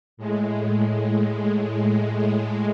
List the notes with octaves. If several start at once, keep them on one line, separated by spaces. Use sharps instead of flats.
A2 G#3